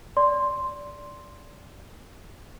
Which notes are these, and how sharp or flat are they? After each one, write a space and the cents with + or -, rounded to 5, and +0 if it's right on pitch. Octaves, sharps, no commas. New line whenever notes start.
D5 -15 C6 +0